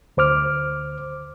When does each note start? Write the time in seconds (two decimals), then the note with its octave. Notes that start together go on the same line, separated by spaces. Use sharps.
0.17 D2 C5 D6 F6